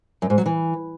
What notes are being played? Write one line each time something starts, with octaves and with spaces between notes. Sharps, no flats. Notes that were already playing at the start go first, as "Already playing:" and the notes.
F#2
G#2
F#3
E3